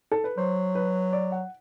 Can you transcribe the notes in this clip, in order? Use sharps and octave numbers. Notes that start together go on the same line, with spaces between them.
A4
B4
F#3 C5
B4
D5
F#5